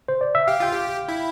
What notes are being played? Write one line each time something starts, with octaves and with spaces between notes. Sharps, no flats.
C5
D5
E5
G4 F5
F4 G5
G4
E4